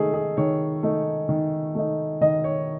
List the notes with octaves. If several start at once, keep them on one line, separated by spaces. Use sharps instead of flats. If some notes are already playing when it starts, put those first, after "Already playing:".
Already playing: D#3 A3 D#4 G#4 A4
G#4
D#3 C#5
A3 D#4
D#3
A3 D#4
D#3 D#5
C#5